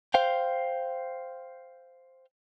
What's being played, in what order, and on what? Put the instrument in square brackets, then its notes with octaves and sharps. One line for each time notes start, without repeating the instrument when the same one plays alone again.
[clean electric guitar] C5 F5 G5